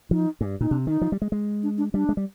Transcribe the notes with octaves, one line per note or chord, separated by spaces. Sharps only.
F3 D#4
G2
A#2 D#4
C3 D4
D#3 D#4
F3
G3
G#3
G#3
D4
D4
G3 D4
G#3
G3